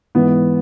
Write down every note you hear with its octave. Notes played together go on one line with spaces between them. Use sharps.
G#2 E3 B3